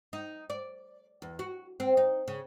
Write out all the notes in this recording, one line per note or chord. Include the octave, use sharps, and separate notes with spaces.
D#4
D5
E2
F#4
C4
D#4
C#3